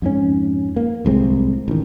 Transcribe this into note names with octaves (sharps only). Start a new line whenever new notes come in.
F2 G#2 C#4
A#3
D1 C2 G#3 C4
A1 D#3